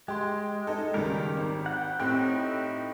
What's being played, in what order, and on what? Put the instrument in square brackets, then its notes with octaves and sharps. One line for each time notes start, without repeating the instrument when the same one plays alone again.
[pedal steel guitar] G#3 [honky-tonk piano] G4 C6
[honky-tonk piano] D#4 A4
[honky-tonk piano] C#2 G3 [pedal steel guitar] D#3 G4 A#4
[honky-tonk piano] G#1
[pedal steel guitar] F#5 G5
[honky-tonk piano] A2 C4 G4 [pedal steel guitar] D#4 E4 F#6